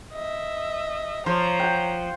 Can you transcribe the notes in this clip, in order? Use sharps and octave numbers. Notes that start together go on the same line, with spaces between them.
D#5 E5
F3 C5 C#5 A#5
F#5 G5